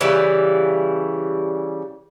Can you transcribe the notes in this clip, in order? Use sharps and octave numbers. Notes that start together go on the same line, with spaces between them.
C#3 E3 G3